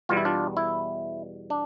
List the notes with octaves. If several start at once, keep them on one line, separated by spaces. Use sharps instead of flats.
E2 B2 G3 F4
E4
D4 F4
E4
D4